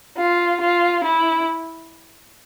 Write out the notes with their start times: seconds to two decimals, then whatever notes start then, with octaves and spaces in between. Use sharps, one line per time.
0.18 F4
0.61 F4
1.04 E4